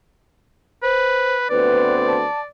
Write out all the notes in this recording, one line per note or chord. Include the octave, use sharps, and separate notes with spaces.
B4 C5
D2 B3 C4 B4 D5
A5